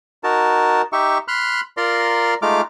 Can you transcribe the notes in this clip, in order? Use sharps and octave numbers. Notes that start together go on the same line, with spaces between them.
D#4 F#4 A#4 A5
D#4 G4 E5 C#6
B5 C6 F6 F#6
F4 A#4 D5 A#5 C6
G#3 A3 D#4 F4 D6 F6